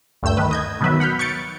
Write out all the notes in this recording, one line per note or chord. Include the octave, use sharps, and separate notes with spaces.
D2 G2 A3 E6 G6
D#3 A3 B4
D#5 G6 G#6
B2 D#3 F#3 B4 E5
F#5 B5 F6 G6
C#6 G6 A6 C#7 D7